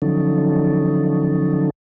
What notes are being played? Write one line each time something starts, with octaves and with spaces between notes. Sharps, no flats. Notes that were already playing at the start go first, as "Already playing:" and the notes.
D3 F3 F#3 C#4 D#4 A4